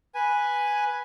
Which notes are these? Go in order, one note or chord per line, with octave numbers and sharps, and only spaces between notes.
B4 G#5